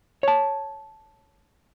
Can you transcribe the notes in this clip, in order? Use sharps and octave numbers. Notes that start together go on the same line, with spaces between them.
C#5 A5